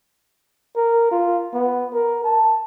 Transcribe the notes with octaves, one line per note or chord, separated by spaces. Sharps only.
A#4
F4
B3
A#4
A5